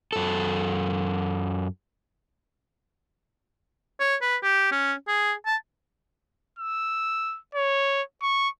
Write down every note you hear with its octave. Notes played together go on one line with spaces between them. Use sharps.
F#2 A4
C#5
B4
G4
C#4
G#4
A5
E6
C#5
C#6